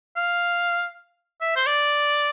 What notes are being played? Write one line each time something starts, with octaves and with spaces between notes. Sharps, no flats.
F5
E5
C5
D5